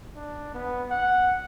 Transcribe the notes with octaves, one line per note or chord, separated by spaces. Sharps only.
D4
B3
F#5